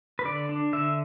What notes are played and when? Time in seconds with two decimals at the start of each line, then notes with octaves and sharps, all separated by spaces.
0.19 B4
0.25 D3 D5
0.49 D4
0.73 D3 E5